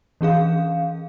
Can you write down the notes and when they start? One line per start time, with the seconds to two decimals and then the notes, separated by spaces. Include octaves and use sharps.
0.21 E3 C#4 G#4 F5